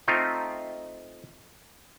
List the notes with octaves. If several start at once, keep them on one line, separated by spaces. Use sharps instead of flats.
A3 C4 D#4 F4